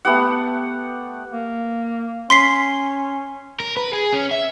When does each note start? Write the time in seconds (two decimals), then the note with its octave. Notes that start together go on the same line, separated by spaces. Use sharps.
0.05 A3 B3 G4 F#5
1.32 A#3
2.30 C#4 C6 B6 C7
3.60 A#4
3.77 B4
3.93 G#4
4.13 C#4
4.31 E5